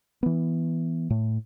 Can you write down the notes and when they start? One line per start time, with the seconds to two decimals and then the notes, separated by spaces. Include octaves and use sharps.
0.23 E3 B3
1.10 A2